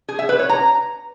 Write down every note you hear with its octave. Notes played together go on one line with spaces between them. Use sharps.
G#4
E5
B4
C#5
A#5